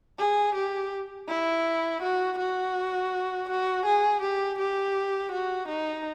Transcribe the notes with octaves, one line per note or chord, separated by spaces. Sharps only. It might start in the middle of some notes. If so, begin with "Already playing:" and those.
G#4
G4
E4
F#4
F#4
F#4
G#4
G4
G4
F#4
D#4